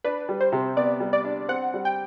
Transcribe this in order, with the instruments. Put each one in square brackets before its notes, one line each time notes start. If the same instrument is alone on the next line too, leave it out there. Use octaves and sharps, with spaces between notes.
[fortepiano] D4 [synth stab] B4
[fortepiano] G3
[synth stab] C5
[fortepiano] C3
[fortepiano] B3 [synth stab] D5
[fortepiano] G3
[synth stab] D5
[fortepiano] D4
[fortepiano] C4 [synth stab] F#5
[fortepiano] G3
[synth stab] G5